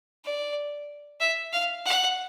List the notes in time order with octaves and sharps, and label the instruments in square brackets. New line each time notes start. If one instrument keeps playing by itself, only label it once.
[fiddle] D5
E5
F5
F#5